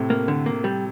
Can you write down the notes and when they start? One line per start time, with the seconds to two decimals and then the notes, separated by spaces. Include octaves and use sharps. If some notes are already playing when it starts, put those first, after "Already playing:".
Already playing: A2 C3
0.10 A#3
0.28 D3
0.46 A#3
0.64 G3